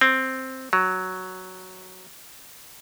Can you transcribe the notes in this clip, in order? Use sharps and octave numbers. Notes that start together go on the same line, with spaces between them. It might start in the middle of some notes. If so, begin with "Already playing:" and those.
C4
F#3